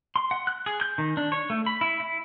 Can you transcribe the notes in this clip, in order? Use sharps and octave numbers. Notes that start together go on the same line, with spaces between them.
C6
F#5
F#6
G#4
G6
D#3
D4
C#5
A3
B5
E4
E4